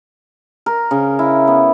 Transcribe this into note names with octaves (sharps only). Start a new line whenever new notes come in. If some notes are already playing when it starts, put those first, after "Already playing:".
A#4
C#3
E4
B3